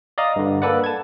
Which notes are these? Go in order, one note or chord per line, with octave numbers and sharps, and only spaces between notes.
D5 D#5 F5 A#5 D#6
G2 D3
A#3 A4 B4 D5 F#5
A5 G#6